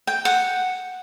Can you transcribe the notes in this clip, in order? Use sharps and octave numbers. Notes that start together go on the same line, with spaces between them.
G5
F#5